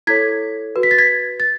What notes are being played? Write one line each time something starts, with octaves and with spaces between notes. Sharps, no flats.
E4 A4 C#5 G#6 B6
F#4 B4
B6
A6
G#6 B6
A6